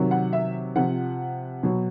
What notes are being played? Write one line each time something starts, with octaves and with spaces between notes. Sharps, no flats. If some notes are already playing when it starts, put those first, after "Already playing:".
Already playing: C3 D#3 F#3
F#5
E5
C3 F3 F#5
B2 F#3